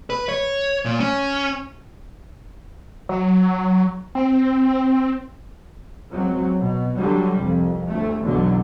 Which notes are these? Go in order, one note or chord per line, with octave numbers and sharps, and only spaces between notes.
B4
C#5
A#2
C#4
F#3
C4
C#2 F#3 C4
B2
D3 F#3 G3
C2 F2
G1 D2 A3
F#1 B1 E2 D3 F#3